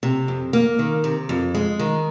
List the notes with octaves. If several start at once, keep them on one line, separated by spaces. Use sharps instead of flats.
C3
F2
A#3
D#3
C3
F2
G#3
D#3